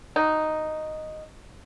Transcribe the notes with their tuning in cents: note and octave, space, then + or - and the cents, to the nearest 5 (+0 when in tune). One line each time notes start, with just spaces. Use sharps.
D#4 +0 F#4 +10